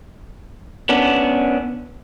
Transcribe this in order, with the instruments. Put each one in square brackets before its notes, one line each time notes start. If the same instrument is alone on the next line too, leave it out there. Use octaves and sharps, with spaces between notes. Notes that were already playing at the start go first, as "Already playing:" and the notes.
[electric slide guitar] B3 C#4 D4